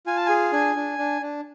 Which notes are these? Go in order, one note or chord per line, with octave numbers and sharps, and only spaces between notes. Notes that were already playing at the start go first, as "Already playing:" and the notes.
F4 G#5
A5
G#5
G#4
D4 G#5
D4
D4
D4